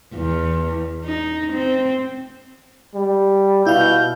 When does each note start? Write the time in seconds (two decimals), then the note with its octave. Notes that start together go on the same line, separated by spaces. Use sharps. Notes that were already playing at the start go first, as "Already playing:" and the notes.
0.14 E2
1.04 D#4
1.53 C4
2.95 G3
3.66 B2 E4 F5 G6